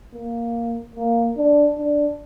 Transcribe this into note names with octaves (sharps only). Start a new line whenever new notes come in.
A#3
A#3
D4
D4